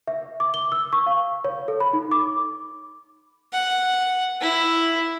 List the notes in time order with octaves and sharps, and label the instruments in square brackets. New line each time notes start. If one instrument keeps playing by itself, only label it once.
[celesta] E5
D6
G7
E6
C#6
F5
C#5
A4
B5
D#4
D6
[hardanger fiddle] F#5
E4